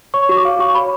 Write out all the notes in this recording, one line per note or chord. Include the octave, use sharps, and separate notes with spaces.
C#5 C#6
F#4 C#6
D6
F5
F#4 C#6
C#5 B5